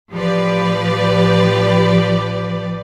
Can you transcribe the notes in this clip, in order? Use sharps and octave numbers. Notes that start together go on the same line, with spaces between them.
A1 F3 G4 B4 D5